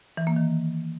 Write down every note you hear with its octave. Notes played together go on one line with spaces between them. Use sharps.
E3
A#3
D#3